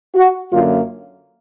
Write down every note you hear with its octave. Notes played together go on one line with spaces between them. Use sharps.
F#4
F#2 D3 F#3 A#3 F4